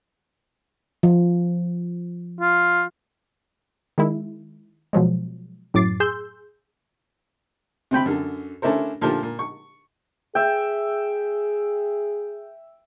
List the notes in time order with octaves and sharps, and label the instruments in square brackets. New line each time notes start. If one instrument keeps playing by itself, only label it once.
[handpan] F3
[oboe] F4
[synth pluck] D#3 G#3 E4
B2 F3 F#3 G#3
F#2 A2 F#3 D6 A6 C7
G#4 C6 E6 G6
[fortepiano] C3 C4 G5 B5
F#2 D3
A3 C#4 D4 E4 A#4 C5
A#2 F3 A3 D4 G4
A#2
C#6
[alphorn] G#4 [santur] E5 G5